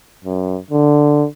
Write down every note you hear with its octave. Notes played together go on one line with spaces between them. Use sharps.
F#2
D3